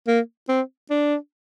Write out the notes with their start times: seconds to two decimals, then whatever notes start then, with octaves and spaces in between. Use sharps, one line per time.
0.08 A#3
0.49 C4
0.91 D4